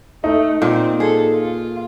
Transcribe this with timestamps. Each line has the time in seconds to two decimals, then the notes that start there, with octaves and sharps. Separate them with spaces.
0.24 A3 D#4
0.62 A#2 C4
1.00 G#4 A4
1.34 F4